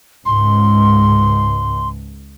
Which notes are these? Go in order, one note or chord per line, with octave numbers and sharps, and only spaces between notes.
C#2 G#2 C6